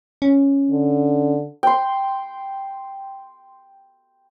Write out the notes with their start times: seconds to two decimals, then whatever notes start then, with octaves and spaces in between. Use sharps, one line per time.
0.22 C#4
0.71 D3
1.63 G5 C6